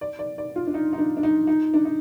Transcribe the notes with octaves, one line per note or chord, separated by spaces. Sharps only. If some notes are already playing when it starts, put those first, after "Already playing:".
D5
D5
D5
F4
D4
D#4
D#4
D4
D4
D#4
D#4
D4
D#4